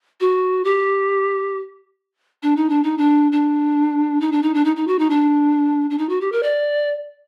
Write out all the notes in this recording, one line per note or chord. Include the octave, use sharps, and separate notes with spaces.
F#4
G4
D4
D#4
D4
D#4
D4
D4
D#4
D4
D#4
D4
D#4
D#4
F#4
D#4
D4
D4
D#4
F#4
G4
A#4
D5